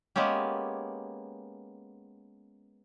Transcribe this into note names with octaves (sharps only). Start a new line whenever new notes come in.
G#3 A#3 B3 C#4 G4